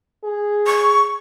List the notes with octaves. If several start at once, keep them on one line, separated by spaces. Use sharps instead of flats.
G#4
C#6